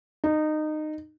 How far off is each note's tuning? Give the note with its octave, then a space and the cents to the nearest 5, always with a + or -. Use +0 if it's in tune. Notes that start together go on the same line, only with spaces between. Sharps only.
D#4 -20